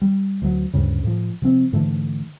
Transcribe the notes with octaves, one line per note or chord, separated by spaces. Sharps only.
G3
D2 F#3
D2 G2 C#3
A2 F3
C3 F3 C4
G#2 D3 E3 A3